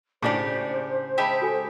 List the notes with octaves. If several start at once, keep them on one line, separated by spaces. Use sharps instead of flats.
A2 C#3 D4 G4 G#4 C5 D5
G#3 G4 E5 G5 A5 B5
F#4 A4 G#5